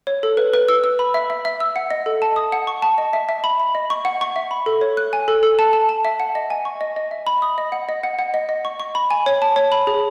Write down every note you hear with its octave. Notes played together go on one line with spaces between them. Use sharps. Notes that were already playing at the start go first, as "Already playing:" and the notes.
C#5
A4
B4
B4
E6
E6
B5
E5
E5
E5
E6
F#5
D#5
A4
A5
D#6
F#5
C#6
A5
D#5
E5
E5
B5
B5
D#5
C#6
F#5
C#6
E5
B5
A4
C#5
F#6
G#5
A4
A4
A5
A5
A5
E5
F#5
D#5
G#5
C#6
D#5
D#5
E5
B5
D#6
D#5
F#5
D#5
F#5
F#5
D#5
D#5
C#6
C#6
B5
G#5
C#5
A5
C#5
B5
G#4